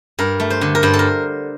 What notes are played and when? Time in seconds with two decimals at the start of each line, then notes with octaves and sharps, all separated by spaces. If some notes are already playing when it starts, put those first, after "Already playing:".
0.19 G2 A#4
0.40 A3
0.50 C5
0.61 D3
0.75 A#4
0.83 G2 C5
0.94 A4
0.99 A#4